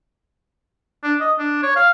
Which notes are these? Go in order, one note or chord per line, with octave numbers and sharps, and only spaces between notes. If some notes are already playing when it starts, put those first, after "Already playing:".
D4
D#5
D4
C#5
F5